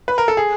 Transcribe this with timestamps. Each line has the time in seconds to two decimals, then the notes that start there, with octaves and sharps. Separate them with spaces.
0.08 B4
0.18 A#4
0.28 A4
0.37 G#4